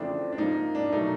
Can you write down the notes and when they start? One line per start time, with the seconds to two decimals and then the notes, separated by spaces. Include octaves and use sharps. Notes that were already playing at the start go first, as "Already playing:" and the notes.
Already playing: F2 C#3 E3 A3 C4 D4
0.32 D4
0.38 G#2 F3 A#3 D#4
0.75 D4
0.93 B2 F#3 A3 D#4